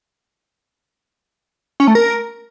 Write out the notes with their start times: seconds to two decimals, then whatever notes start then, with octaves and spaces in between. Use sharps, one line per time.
1.80 C#4
1.87 A3
1.95 A#4